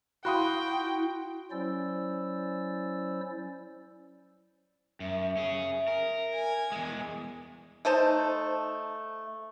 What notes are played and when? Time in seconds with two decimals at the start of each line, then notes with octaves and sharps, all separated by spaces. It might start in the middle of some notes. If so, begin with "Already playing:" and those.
0.25 E4 F#4 F5 G5 B5 C6 D#6 F#6
1.51 F#3 C#4 E4 C5 D5 E6
5.00 F#2 E5
5.37 C#4 G#4
5.87 A#4
6.33 G#5
6.72 E2 G#3
7.85 A3 D#4 C5 A5